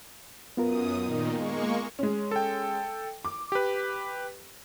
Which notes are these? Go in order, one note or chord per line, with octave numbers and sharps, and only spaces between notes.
F#2 B3 F4 A#4 D#6
A#2 D#3 D#4
G#3 A#3 C#6
G#3 C#4
A4 G5
D6
G4 B4